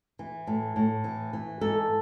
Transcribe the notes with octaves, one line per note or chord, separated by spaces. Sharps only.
E3
A2
A2
E3
E3
G#2 A4